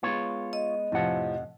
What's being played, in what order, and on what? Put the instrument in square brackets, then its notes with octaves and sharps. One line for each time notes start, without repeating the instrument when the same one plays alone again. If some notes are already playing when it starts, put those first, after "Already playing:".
[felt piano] G#3 B3 [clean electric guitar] F4 C#5
[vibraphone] D#5
[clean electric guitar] F2 F#5 [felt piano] A2 C3 F3